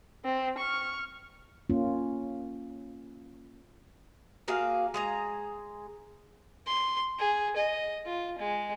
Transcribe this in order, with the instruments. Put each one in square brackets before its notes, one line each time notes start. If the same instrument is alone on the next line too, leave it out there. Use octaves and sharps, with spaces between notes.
[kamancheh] C4
C#6 F6
[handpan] A#3 C#4 F4
[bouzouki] A#3 F#4 G#4 F5
G#3 G#4 A#5
[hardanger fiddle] C6
G#4
D#5
F4
G#3